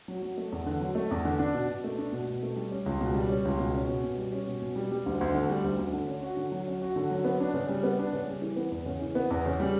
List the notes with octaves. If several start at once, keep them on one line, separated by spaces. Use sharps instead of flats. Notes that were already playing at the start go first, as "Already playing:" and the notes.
F#3
F#3
A3
E2
D3
F#3
A3
E2
D3
D4
B2
B2
A3
D4
B2
B2
A3
G3
C#4
C#2
B2
G3
C#4
C#2
B2
C#4
B2
B2
G3
C#4
B2
B2
G3
G3
D2
D2
D3
G3
D2
D2
D3
C#4
F#4
D3
F#3
C#4
F#4
D3
F#3
B3
D4
C#3
G3
B3
D4
C#3
G3
E3
B3
E2
C#3
E3
B3
E2
C#3
G3